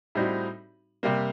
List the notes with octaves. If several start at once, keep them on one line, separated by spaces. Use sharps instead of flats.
A2 G3 C4 D#4 F#4
C3 G3 A#3